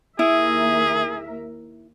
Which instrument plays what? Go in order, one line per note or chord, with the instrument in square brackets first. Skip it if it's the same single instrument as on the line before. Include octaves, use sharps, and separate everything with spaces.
[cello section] D#2 A#4 E5 [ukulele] E4 [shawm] G#4